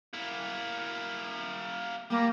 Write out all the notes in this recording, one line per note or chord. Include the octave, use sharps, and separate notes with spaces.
A#3 E4
G3 A#3